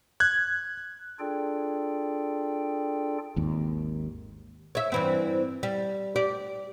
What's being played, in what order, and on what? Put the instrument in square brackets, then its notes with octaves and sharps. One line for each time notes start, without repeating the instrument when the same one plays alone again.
[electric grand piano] F#6 G#6
[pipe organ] D4 F4 G#4 A4 D5 G5
[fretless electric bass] G#1 D#2
[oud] C#5 E5
G2 E3 C4
G3
G4 D5